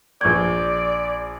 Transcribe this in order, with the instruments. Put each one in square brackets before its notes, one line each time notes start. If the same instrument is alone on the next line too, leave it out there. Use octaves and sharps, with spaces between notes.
[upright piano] A#1 C#6 G6 [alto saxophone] D5 [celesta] G#6